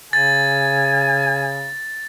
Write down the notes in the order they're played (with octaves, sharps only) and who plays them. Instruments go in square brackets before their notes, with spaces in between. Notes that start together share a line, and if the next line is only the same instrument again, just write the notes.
[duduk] C#3 [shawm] G#5 [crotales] A6